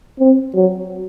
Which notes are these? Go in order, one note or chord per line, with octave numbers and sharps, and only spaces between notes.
C4
F#3